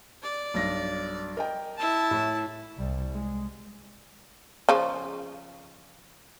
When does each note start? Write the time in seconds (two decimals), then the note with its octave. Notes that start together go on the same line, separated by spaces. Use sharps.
0.23 D5
0.54 B1 G2 A#6
1.37 A#4 D#5 G5
1.78 E4 A5
2.11 A2
2.77 C2 G3
3.12 G#3
4.69 C#3 F3